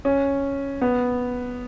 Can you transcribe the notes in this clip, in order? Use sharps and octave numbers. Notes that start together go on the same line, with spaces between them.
C#4
B3